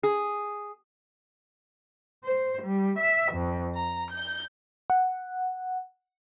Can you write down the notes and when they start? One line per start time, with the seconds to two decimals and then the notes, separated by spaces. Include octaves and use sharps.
0.03 G#4
2.23 C5
2.61 G3
2.99 E5
3.31 F2
3.75 A#5
4.11 G6
4.90 F#5